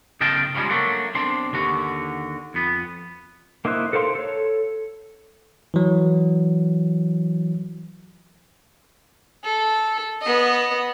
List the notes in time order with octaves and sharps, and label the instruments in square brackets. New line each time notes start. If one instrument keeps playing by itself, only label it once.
[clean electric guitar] B1 C#3 D#5 F5 G5 A5
C#3 F3 G3 G#3 C#4
F#3 A3 A#3 D4 F#4
B1 C4 D4 C6
D#2 D3 F#4
F2 B3
[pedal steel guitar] A#3 D#4 E4 C5 F#6
A4 A#4 C5 F5 C6
A4 C#5
[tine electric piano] E3 F#3
[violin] A4
B3 D#5